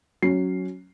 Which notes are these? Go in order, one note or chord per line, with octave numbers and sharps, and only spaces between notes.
F#3 C#4 C7